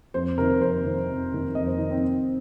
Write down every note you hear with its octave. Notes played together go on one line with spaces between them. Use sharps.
F2 C5
C3 D#3 A#4
F2 C5
C3 D#3
F2
C3 D#3
F2 D#5
C5
C3 D#3 D#4
C4